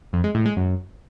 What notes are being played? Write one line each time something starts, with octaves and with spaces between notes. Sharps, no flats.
F2
G#3
A2
G#3
F#2